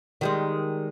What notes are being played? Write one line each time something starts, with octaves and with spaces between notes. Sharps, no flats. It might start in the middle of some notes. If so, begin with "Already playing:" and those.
D#3 G3 G#3